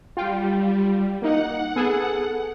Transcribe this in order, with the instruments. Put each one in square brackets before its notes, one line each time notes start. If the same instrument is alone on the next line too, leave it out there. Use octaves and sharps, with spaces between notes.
[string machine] G3 [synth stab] F4 G5
[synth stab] A#3 D#4 [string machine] F#5
[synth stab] B3 G#4 A4